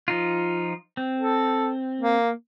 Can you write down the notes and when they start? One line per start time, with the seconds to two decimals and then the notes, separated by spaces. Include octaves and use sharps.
0.08 F3 D#4 F4
0.97 C4
1.18 A4
2.01 A#3